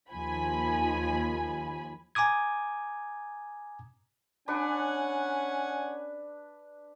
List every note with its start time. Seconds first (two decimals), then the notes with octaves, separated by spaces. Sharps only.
0.10 D#2 F3 G#5 B5
2.15 G#5 A#5 D6 D#6 G#6
4.48 C#4 D4 B4 C#5 F#5 G#5